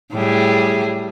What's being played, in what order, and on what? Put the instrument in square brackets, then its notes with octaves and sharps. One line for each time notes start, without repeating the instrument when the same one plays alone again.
[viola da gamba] A2 G3 G#4